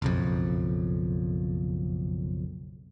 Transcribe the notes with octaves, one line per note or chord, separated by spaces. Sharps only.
F#1 B1 F2